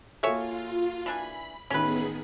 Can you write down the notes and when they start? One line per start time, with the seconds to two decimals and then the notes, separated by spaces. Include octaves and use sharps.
0.23 A#3 F4 F#4 A4 C#5 E5 G#5
1.06 E3 D4 G#5 B5
1.70 A1 D#3 B3 C#4 E4 G#4 B4 B5